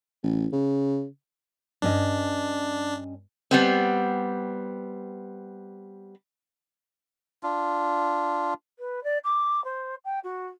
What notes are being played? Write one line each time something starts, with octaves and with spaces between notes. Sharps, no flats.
A1
C#3
G2 C#4 D4 D#5
G3 B3 C4
D4 F4
B4
D5
D6
C5
G5
F#4